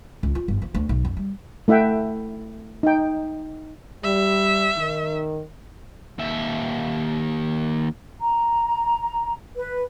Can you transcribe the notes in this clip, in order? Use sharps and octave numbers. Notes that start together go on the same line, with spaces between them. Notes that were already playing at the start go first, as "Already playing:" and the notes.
C#2
F4
G1
F3
D2
B1
F#2
G3
A3 E4 E5 F#5 G5
D#4 G5
G3 E5
D#3
D#2 E5
A#5
B4